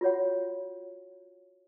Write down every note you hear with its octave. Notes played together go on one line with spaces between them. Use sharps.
F4 F#4 C#5 F#5